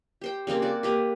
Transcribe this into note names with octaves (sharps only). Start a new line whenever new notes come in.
G4 C5 G5
C#3 G3 A#3 C4
F#4 D5
A#3 G4 B4